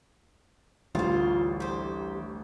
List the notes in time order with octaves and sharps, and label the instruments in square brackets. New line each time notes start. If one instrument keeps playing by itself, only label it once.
[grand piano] A1 D2 A6 [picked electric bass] E3 G3 [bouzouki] F4 C5
[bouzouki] G4 C5